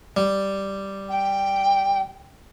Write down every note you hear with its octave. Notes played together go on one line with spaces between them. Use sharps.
G3
G5